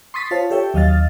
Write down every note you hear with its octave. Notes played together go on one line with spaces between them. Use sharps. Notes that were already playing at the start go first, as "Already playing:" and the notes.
C6 C#6 D#6 A6 B6
F4 C5 C#5 F5 A5
G4 A4 C#5 E5 G5
D#2 F#3 D#5 F5 F6 A6